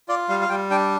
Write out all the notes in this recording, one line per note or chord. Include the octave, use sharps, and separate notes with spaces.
F4 D5
G3 F5
F5
G3 G5
D4 G5